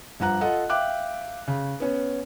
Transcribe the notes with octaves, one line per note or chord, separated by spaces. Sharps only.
G2 F3 F#5 A#5 F#6
F4 A4 D#5 F#5
E5 F5 G5 D6 F#6
C#3
B3 C#4